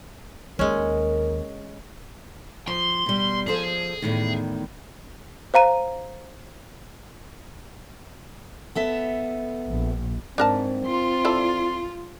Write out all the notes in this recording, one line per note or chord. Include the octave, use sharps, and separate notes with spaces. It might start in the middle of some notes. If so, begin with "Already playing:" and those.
D#2 G#3 C#4 A#4
F3 C6
B2 G3
F3 G#4 A4 C5
E2 A2 D#3
C5 F5 A#5 D#7
B3 A4 E5
A#1
G#2 C4 D4 A#4 A5
F4 C6
E4 A4 D5